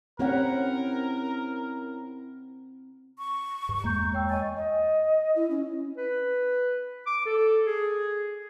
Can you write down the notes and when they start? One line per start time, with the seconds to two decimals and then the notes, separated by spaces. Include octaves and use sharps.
0.19 C4 C#4 E4 G4 A#4 F#5
3.18 C#6
3.69 G2
3.84 E2 G#3 A#3 A#5 G6
4.13 C#5 G5 E6
4.29 D#5 G#5 C#6 A6
4.57 D#5
5.36 E4
5.50 C#4
5.97 B4
7.06 D6
7.26 A4
7.67 G#4